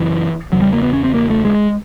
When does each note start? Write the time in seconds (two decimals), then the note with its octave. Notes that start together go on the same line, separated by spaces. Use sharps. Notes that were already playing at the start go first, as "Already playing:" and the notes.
Already playing: F#2 C#3 E3
0.52 E2 C#3 F#3
0.62 G3
0.73 A#3
0.83 B3
0.93 C#4
1.04 C4
1.14 A#3
1.30 A3
1.45 G#3